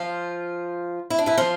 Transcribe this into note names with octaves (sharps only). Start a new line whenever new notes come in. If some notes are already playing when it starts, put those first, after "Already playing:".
Already playing: F3 F4
E4
D4
E3 E4
F3 F4